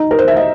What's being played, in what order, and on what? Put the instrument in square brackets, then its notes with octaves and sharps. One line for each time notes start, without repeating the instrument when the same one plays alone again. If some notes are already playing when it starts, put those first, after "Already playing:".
Already playing: [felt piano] D#4
A#4
C5
E5
D#5